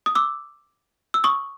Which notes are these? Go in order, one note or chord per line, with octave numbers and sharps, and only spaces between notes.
D#6
D6 E6
E6
C#6 D#6